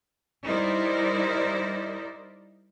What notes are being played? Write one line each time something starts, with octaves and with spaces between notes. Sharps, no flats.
G3 D#4 E4 A#4 C5 D5